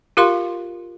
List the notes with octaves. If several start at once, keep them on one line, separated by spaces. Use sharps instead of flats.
F4 G4 A#4 F5 C6